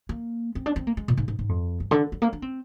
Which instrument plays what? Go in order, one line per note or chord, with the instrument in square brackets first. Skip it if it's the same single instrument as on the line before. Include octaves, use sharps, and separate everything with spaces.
[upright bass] A#3
C4
D4
C4
A#3
G#3
A#2
G#2
G#2
G#2
F2
G2
D3
G3
A#3
D4
C4